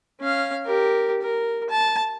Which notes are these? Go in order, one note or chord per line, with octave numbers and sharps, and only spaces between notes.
C#4 F5
G4 A#4
A#4
A5